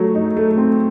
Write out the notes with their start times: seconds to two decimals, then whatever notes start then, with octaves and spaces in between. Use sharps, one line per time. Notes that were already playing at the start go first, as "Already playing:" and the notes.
Already playing: F#3 A3
0.15 D#4
0.37 A3
0.58 C4